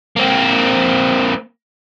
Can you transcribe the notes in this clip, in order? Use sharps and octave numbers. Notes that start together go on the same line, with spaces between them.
A#3 C4